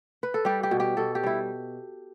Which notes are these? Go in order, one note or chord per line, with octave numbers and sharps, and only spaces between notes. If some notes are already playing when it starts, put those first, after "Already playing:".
B4
A4
G3 G4
G4
B2
G4
B2 A4
G4
G3 E4